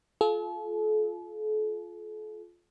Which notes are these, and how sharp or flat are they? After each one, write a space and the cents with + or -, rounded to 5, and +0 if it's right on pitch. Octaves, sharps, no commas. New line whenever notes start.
F4 +0 A4 -40